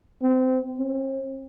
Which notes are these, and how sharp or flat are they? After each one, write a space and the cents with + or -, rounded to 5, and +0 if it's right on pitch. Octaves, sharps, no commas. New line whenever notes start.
C4 -25
C4 +45